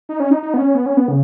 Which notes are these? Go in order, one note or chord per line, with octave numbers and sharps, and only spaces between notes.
D#4
C#4
D#4
D#4
B3
C#4
B3
C#4
B3
C#3